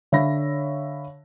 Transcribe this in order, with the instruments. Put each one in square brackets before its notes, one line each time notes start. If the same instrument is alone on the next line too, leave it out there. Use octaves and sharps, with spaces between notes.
[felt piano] D3 C#5 E5 F5 B5 A#6